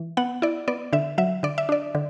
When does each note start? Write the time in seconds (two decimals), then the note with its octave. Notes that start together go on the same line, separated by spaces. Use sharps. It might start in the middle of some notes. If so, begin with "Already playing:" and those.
Already playing: E3
0.17 B3 F#5
0.42 E4 D5
0.68 B3 D5
0.93 D3 E5
1.18 F#3 E5
1.43 D3 D5
1.58 E5
1.69 D4 D5
1.95 D3